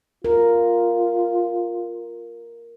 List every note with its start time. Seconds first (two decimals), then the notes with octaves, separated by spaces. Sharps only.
0.25 F4 A#4